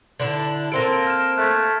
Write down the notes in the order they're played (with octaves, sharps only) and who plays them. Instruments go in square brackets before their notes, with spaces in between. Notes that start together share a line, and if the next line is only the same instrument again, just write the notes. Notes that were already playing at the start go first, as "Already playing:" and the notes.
[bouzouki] D3 D4 E4
[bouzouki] A#3 C4 A4 [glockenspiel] D7
[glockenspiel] F6 E7
[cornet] A3 [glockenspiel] F#6 G#6